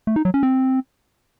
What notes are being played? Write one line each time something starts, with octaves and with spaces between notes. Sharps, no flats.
A3
D#4
F#3
C#4
C4